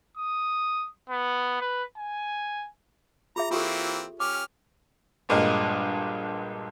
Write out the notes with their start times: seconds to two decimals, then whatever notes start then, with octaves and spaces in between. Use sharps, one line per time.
0.17 D#6
1.09 B3
1.61 B4
1.97 G#5
3.36 F4 G#4 E5 A#5
3.51 E3 A#3 C4 F4 G4 A4
4.20 C#4 G4 D6 F6
5.29 A#1 G2 G#3 A#3 D#5